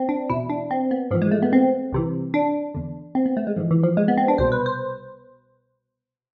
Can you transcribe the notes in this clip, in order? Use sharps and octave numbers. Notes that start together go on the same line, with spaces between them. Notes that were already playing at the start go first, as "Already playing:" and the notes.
Already playing: C4
D4
E2 B2 E4
D4
C4
B3
G#2 E3 F3
G#3
A3
B3
C4
C2 C3 E3
D4
E2 D3
C4
B3
A3
G#3
G#2 E3 F3
E3
F3
G#3
B3
C4
D4
C2 B2 C5
B4
C5